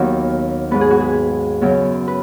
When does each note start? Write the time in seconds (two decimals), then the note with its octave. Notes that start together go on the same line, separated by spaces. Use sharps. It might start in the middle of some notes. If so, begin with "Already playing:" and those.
Already playing: D#2 D#3 F#3 B3 F#4
0.71 G#2 G#3 B3 B4
0.81 G#4
0.90 F#4
1.00 G#4
1.61 F#2 C#3 F#3 B3
2.08 B4